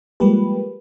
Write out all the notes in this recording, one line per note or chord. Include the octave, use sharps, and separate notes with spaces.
F3 G3 G#3 A#3 G4 B4